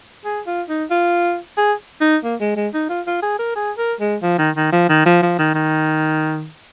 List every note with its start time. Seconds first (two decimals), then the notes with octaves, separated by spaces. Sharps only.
0.25 G#4
0.46 F4
0.69 D#4
0.91 F4
1.57 G#4
2.01 D#4
2.24 A#3
2.40 G#3
2.56 G#3
2.73 D#4
2.90 F4
3.07 F4
3.22 G#4
3.39 A#4
3.55 G#4
3.78 A#4
4.00 G#3
4.22 F3
4.38 D#3
4.56 D#3
4.72 F3
4.89 D#3
5.06 F3
5.22 F3
5.38 D#3
5.55 D#3